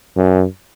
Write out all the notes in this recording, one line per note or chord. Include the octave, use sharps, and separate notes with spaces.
F#2